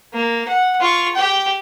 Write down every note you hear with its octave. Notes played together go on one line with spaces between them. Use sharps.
A#3
F#5
F4 C#6
G4 G5